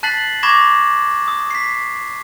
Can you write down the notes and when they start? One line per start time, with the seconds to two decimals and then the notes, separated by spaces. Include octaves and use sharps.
0.03 A5 F#6 A6 B6 C7 F#7
0.43 B5 C#6 D6 G#6 A#6 E7
1.28 D#6
1.51 B6 C7